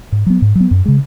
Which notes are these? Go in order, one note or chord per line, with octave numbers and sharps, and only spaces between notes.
G#2
F#3 B3
G#2
F#3
B3
F#2
C#3 G#3